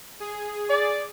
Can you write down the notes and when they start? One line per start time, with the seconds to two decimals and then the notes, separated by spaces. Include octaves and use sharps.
0.20 G#4
0.69 D5